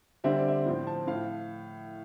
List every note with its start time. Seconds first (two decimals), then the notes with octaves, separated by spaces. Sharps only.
0.24 D3 G3 C4 E5
0.37 D5
0.48 E5
0.66 A2 F3 C4
0.87 A5
1.07 A2 F5